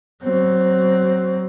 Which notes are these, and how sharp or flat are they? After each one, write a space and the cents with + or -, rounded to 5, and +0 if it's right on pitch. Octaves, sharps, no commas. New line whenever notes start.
F#3 +20 C4 +5